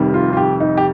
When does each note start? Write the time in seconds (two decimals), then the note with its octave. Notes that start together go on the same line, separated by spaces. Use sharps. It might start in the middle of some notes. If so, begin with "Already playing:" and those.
Already playing: F1 F2 D#3 G3
0.14 F4
0.33 F4
0.37 G4
0.60 D#4
0.77 G4